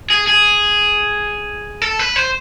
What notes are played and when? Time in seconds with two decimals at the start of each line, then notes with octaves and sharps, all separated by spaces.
0.10 G#4
0.27 G#4
1.82 A4
1.99 B4
2.16 C5